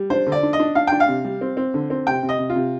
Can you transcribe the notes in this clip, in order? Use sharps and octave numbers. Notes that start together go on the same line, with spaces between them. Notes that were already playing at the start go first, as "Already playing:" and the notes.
Already playing: G3
D4 C5
D3
D5
D4
D#5
D4
D4 F5
D4 G5
F5
C3
G3
C4
C4
D3
C4
C3 G5
C3
D#5
C3
F4
C3